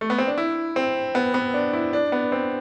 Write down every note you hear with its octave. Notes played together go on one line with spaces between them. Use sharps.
A3
B3
C4
D4
E4
C4
B3
B3
D4
E4
D4
B3
C4